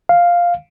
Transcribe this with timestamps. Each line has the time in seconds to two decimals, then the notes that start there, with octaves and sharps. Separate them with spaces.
0.09 F5